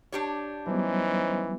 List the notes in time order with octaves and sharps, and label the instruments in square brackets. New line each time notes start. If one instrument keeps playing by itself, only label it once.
[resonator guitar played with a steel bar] D4 G4 C#5
[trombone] E3 [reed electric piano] F#3 G3 B3 [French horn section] C#4 D#4 C5